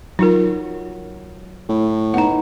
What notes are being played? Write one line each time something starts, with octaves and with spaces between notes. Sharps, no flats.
F#3 D#4 F4 A#4
A2
B3 D#4 F#5 A#5